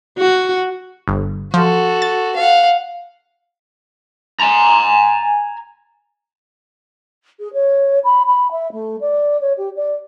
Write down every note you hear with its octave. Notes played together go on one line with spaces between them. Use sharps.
F#4
G1
F3 F#4 A4
A6
F5 F#5
G#5 A#5
G#4
C#5
B5
B5
E5
A3
D5
C#5
G4
D5